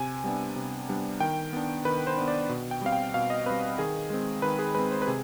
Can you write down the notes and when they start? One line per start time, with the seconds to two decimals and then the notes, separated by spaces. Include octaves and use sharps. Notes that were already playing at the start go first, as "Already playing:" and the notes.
Already playing: C3 G#5
0.24 G3 B3 D4
0.56 C3
0.89 G3 B3 D4
1.20 D#3 G5
1.53 B3 D4
1.85 D#3 B4
2.07 C5
2.17 B3 D4
2.28 D5
2.49 B2
2.71 G5
2.81 G3 C4 F5
2.92 G5
3.14 B2 F5
3.30 D#5
3.46 G3 C4 B4
3.78 D#3 G#4
4.10 G#3 C4
4.42 D#3 B4
4.59 G#4
4.75 G#3 C4 B4
4.92 C5
5.02 B4
5.07 C3 G#4